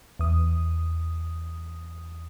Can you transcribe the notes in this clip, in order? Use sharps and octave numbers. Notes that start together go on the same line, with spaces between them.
E2 D#6